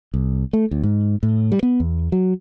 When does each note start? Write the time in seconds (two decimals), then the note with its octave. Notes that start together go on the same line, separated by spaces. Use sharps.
0.14 C2
0.53 A3
0.71 D2
0.83 G#2
1.23 A2
1.52 G3
1.63 B3
1.80 E2
2.12 F#3